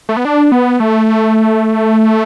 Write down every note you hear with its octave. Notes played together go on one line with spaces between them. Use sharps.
A3
B3
D4
B3
A3